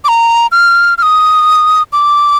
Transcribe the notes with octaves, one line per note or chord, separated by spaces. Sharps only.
D6
A#5
F6
F6
D#6
D6